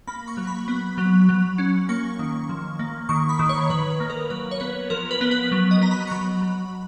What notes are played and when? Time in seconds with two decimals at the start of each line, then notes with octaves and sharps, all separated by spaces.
0.07 A#3 B5
0.28 C#6
0.37 F#3
0.47 B5
0.68 B3
0.98 F#3
1.29 F#3
1.58 C#4
1.89 A#3 C#6
2.19 D#3
2.49 F3
2.79 A#3
3.09 D#3 C#6
3.29 B5
3.39 D#3
3.49 C#5
3.70 D#3 B4
3.90 B4
4.00 A#3
4.10 A#4
4.30 F#3 B4
4.51 C#5
4.60 B3 B4
4.90 F3 A#4
5.11 B4
5.21 B3
5.31 B4
5.52 F#3
5.71 D#5
5.81 B3 A#5
5.91 B5
6.07 C#6
6.11 F#3 B5
6.42 F#3